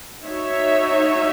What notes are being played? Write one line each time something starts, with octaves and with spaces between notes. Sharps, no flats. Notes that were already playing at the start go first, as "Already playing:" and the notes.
D#4 F#4 C#5 E5